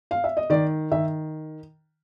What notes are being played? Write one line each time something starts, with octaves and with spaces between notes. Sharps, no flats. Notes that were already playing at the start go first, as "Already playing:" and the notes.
F5
E5
D#5
D#3 D5
D#3 E5